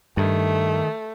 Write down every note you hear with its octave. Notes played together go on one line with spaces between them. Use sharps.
G2 D#3 A3